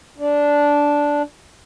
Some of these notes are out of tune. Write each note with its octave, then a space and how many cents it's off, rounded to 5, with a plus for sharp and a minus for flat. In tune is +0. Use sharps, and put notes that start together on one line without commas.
D4 -10